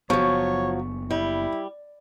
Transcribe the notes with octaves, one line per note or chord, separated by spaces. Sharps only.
F#1 F3 F#3 B3 C#5 C#6
G3 E4